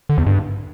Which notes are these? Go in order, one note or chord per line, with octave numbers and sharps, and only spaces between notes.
D3
E2
G2